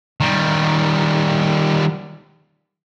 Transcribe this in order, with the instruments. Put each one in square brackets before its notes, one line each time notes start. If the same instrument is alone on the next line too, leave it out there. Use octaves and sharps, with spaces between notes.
[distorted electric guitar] D#3 G3